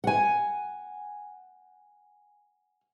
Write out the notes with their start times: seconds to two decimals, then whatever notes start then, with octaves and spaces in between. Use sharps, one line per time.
0.04 F#5 G#5